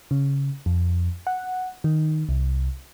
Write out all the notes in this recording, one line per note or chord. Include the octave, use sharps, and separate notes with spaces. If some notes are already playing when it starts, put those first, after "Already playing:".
C#3
F2
F#5
D#3
C2